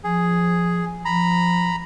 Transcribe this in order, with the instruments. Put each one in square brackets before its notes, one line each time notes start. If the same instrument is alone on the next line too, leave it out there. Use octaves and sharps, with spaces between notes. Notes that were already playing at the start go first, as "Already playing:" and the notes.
[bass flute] F3 [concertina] G#4
[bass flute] F3 [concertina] A#5 B5